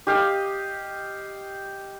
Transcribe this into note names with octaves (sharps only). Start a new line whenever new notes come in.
G4 D#5 F5